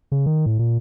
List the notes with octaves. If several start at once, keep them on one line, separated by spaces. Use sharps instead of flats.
C#3
D#3
A2
A#2